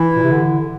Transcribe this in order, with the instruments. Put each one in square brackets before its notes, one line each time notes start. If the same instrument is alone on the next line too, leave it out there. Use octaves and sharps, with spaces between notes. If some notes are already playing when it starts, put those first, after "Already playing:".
Already playing: [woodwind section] E3 E4
[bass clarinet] A#2
C3
D3